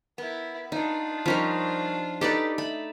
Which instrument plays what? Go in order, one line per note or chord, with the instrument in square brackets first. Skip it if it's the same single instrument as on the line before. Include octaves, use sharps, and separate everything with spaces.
[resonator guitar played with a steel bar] B3 [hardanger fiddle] E4 A#4
[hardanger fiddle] D4 F4 [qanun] D#4
[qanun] F3 D#4 [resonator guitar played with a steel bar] G3 C#4 A#4
[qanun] D#4 D5 [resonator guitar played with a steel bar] G4 A4 B4
[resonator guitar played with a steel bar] A3 [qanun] B5